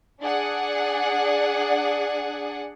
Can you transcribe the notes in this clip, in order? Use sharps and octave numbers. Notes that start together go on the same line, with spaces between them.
D4 G#4 D5 F#5